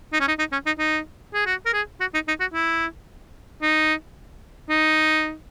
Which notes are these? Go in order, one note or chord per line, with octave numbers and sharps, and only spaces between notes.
D#4
C#4
D#4
D#4
C#4
D#4
D#4
G#4
F#4
A#4
G#4
F#4
D#4
D#4
F#4
E4
D#4
D#4